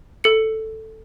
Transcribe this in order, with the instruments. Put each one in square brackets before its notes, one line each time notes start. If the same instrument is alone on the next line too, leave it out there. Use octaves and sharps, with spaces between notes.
[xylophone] A4 C#7